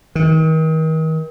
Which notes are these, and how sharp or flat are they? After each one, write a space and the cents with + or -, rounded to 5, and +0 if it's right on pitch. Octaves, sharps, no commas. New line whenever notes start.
D#3 +35